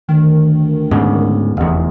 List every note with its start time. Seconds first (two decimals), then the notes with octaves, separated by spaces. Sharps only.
0.09 D2 D#3
0.91 G#2 C#3
1.57 F1 E2